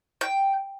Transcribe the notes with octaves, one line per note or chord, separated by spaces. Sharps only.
G5